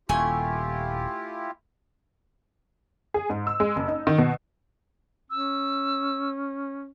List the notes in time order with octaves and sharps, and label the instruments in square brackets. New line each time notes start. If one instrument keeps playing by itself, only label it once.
[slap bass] D#1 [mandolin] A3 G#5 C#6 [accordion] E4 F4 G4
[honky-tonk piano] G#4
G#2
E6
G#3
F#1
D#4
D#3
B2
[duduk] C#4 [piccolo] E6